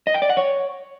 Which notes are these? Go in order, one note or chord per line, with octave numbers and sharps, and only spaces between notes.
D#5
G5
D5
F#5
C#5